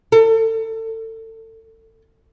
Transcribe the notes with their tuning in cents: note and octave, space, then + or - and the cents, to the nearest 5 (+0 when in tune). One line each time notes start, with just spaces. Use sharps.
A4 +30